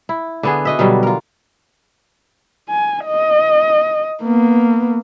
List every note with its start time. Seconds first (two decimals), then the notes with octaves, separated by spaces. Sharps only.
0.09 E4
0.43 D3 B3 G#4
0.65 F#4 D#5 E5
0.79 B2 D3 F#3 G3
1.03 F4 A#4
2.69 G#5
3.06 D#5
4.23 A#3 B3